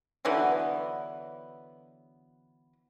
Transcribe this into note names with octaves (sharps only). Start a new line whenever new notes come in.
D3 E3 F#3 B3